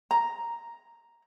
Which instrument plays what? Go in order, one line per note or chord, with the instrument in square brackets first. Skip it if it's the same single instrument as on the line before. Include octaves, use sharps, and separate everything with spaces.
[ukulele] A#5